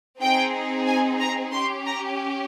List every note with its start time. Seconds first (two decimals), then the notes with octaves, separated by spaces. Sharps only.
0.21 C4 D#4 G#4 G5
0.87 G#5
1.20 A#5
1.52 C#4 G4 C6
1.86 A#5